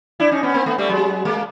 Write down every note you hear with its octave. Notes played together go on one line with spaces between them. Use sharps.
D4 E4
C#4 D#4
B3 C#4
A#3 C4
A3 B3
G3 A3
F#3 G#3
G#3 A#3